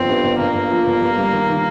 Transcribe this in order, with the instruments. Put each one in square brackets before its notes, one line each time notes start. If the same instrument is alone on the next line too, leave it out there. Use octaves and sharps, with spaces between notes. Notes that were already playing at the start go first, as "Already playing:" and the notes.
Already playing: [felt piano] G1 F3 [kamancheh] C4
[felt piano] G2
G1
[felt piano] G1 [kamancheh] A#3
[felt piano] G1
F3
G1
G2
G3
D#3
D#3